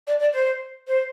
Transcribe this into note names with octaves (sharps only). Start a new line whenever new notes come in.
D5
D5
C5
C5